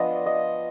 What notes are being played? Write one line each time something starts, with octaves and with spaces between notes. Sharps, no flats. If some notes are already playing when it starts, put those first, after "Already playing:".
Already playing: F3 B3 D4 D#5
D#5